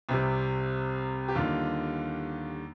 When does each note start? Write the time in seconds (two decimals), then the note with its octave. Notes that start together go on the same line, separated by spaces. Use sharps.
0.09 C2 C3 G3
1.28 G4
1.35 D#2 D3 G3 F4